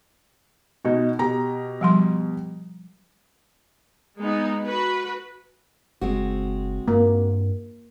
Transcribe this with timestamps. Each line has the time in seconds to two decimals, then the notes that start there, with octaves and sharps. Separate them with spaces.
0.85 B2 D#4 F#4
1.19 B2 G4 A#5
1.81 F3 G3 C6
4.20 G#3 B3 D#4
4.64 F#4 B4
6.01 F#1 G#3 C4 F#4
6.88 G2 A#3